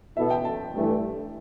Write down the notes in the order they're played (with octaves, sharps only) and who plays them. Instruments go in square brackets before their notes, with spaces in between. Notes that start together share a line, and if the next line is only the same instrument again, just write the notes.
[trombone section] B2 B3 E4 A4 [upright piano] E5
[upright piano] G5
A5
[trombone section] G2 E3 A3 E4 A4